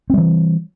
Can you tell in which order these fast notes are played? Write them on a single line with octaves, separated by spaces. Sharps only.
C4 G3 E3